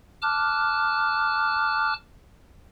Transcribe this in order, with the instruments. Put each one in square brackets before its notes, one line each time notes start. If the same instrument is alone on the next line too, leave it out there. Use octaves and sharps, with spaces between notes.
[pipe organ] A5 D6 F6 F#6